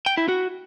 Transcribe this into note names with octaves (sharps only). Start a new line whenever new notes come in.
G5
E4
F#4